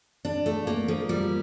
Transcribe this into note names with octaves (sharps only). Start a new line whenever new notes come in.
D4
A3
A#3
F3
G3